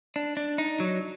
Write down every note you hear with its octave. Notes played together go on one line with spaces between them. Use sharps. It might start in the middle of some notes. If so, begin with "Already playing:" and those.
D4
D4
D#4
F#3